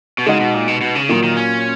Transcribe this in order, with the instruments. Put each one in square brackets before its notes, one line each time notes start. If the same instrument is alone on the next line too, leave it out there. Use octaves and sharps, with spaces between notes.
[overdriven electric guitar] B2
[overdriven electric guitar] C#3 [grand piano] G#3 D#4 F#4
[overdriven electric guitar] B2
A#2
B2
B2
C#3
[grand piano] A#2 F#3 A#3 F4 [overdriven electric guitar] D#3
[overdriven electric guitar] D#3
C#4